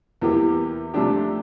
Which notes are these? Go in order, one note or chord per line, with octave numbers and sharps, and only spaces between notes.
E2 E3 A#3 E4 G4
C3 F3 A3 D4 G4